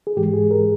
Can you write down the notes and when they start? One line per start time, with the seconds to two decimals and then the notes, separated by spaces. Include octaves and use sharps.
0.07 G#4
0.16 G#2 E3 G#3 G4
0.34 G#4
0.51 A#4